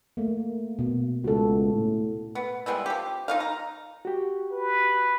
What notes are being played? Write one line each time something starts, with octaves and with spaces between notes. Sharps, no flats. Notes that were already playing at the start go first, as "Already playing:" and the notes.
A3 A#3
B2
C#2 F#4 A4
A2
B3
G3 G#3 B3 E4
F3 G4
D#4 F4 F5
A#5
F#4 G4
B4